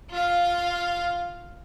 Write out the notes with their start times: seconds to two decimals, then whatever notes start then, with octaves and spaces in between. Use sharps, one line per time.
0.10 F4 F5